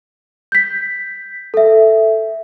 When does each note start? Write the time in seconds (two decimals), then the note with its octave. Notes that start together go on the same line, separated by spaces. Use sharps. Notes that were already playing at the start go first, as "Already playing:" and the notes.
0.52 G6 B6
1.54 A4 E5